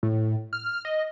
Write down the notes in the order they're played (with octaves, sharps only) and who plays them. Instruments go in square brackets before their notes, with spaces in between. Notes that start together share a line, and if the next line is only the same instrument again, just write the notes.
[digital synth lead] A2
F6
D#5